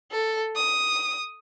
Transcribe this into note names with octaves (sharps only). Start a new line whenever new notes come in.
A4
D#6